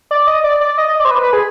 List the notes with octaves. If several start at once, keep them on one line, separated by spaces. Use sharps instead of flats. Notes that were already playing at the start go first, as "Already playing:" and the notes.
D5
D#5
D5
D5
D#5
D#5
D5
C5
B4
B4
G#4